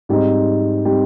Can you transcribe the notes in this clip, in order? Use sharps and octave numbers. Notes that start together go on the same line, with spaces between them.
G#2 G3 C4 D#4
G3 C4 D#4